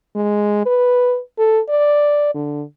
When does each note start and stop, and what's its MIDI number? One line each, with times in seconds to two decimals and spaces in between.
0.15 0.61 56
0.66 1.20 71
1.38 1.60 69
1.69 2.31 74
2.35 2.63 50